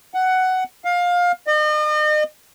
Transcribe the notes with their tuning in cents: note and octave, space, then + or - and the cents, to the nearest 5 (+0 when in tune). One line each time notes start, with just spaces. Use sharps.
F#5 +10
F5 +20
D#5 -40